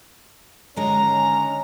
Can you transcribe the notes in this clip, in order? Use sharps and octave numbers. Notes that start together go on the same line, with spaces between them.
D3 D#3 G#3 C#4 A#5